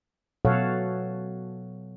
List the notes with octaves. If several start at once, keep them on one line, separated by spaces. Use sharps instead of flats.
B2 F#3 A4 C#5 F5 F#5